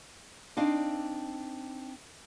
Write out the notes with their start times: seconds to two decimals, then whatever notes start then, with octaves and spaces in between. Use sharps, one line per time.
0.57 C4 D4 D#4 F5